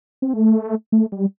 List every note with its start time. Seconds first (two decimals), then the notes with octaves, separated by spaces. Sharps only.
0.22 C4
0.33 A3
0.92 A3
1.12 G3